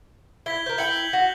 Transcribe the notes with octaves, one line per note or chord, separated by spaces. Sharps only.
E4 G#6 B6 G7
A#4 C5 G6
E4 G5 C#7 F#7 G7
F#4